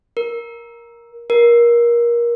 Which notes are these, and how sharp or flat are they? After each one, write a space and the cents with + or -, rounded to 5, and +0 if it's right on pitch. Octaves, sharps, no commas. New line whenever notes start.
A#4 +10
A#4 +25